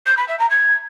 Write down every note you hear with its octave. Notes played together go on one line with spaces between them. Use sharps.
G6
B5
E5
A#5
G#6